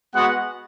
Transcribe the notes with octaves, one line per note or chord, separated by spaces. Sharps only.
G#3 B3 F#4 F#5